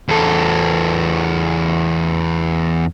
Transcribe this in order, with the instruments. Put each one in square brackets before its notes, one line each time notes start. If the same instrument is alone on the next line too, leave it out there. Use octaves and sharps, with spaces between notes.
[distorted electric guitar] E2 A4